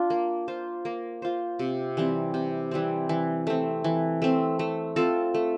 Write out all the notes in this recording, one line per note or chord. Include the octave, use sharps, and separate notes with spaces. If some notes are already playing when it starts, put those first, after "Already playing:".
Already playing: D4 F4
A#3
F4 C5
A#3
F4 C5
C3
E3 G3 C4
C3
E3 G3 C4
E3
A3 C4
E3
A3 C4
A3
C4 F4 A4
A3